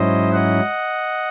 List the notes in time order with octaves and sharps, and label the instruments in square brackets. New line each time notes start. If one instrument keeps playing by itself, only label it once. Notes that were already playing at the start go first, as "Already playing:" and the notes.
Already playing: [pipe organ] G#2 F#3 C#4 E4 C5 D#5
D#5 F#5